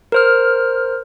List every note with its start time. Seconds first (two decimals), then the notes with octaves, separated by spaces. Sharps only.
0.12 A#4 C5 F6